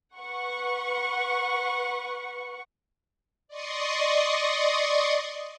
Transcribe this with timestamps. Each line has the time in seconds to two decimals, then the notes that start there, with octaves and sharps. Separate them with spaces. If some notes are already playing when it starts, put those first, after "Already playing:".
0.18 B4 F#5 C#6
3.48 D5 D#5 C6 C#6 D#6